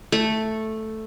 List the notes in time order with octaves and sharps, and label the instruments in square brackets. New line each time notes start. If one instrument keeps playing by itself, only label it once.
[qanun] A3